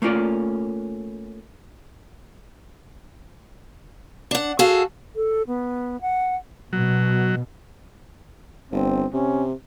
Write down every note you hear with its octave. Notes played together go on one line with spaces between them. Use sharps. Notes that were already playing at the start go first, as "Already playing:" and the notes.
A3 A#3 C#4 F4 D5
D4 F#5
F#4 G#4 A4 F5
A4
B3
F#5
B2 F#3
G1 C4
C3 C#4